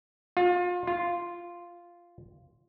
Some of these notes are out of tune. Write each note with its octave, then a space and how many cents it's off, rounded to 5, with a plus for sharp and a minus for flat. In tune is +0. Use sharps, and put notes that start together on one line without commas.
F4 +30
F4 -5